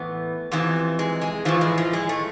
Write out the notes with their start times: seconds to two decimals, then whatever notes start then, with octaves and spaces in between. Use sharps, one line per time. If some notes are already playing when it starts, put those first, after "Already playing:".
Already playing: A2 E3 B3
0.51 F2 C3 E3
0.99 G#3
1.21 G#3
1.45 A2 E3 F3
1.61 G#3
1.78 F3
1.93 G#3
2.09 A3